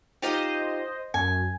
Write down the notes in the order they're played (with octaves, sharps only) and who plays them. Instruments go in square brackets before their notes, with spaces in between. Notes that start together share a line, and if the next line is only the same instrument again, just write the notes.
[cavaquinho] D#4 F4 G4 [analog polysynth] C5 D#5
[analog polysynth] F#2 [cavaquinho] G#5